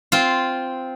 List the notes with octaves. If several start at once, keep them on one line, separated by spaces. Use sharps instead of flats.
C4 F4